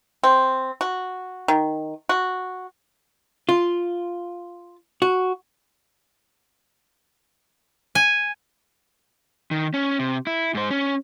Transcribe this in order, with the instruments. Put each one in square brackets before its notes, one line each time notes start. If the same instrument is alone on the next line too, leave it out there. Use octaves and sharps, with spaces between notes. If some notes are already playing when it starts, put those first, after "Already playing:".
[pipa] C4
F#4
D#3
F#4
[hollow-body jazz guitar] F4
F#4
[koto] G#5
[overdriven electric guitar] D#3
C#4
C3
E4
G#2 C5
C#4